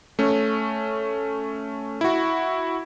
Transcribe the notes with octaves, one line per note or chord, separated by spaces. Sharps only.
A3 C#4
E4 F#4